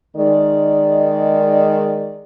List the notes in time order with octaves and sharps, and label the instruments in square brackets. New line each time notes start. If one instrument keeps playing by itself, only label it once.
[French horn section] D#3 G#3 D5